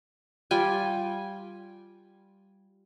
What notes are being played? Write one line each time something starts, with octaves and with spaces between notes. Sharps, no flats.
G3 F4 G5 G#5